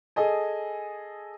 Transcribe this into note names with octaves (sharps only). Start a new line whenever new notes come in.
G#4 A4 D#5 G#5